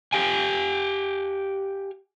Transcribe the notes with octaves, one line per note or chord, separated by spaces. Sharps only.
G4 F5 G#5